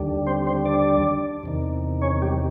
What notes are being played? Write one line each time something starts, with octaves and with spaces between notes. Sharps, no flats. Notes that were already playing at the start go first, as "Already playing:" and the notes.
Already playing: D#2 D3 G3
C4 C5
C4 C5
D4 D5
E2 C3 D#3
C#4 C#5
G3 G4